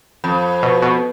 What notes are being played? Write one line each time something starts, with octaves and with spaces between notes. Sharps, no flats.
F2
B2
B2